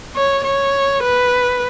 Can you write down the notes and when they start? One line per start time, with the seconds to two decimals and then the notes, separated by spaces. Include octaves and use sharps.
0.16 C#5
0.45 C#5
1.03 B4